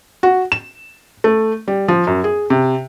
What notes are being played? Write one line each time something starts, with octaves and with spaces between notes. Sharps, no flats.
F#4
E7
A3
G3
F3
F#2
G#4
C3